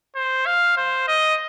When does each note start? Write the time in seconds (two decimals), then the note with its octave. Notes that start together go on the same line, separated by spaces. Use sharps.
0.16 C5
0.47 F5
0.77 C5
1.08 D#5